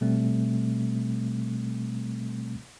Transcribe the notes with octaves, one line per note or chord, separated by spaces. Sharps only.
B2 G3 A3 C4